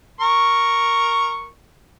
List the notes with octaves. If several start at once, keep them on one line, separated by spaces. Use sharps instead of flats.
A#4 C#6